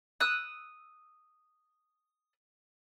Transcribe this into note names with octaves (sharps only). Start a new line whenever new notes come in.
D#6 E6 F#6